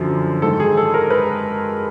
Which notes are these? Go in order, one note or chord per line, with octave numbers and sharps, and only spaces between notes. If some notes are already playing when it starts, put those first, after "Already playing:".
Already playing: F#2 D3 F3
G#2 D#3 A4
G#4
A4
A#4
B4